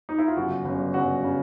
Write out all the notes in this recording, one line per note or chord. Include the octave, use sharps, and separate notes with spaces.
D#4
E4
F4
G1 F#2 C#3 F#4
G1 F#2 C#3
G1 F#2 C#3 F#4
C#3